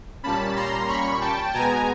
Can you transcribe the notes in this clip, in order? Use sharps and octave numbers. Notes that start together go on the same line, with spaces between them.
A#2 G3 A#3 C#4 A5 B5
A#5 C6
B5 C#6
G5 A5
B2 G#3 B3 G#5 A#5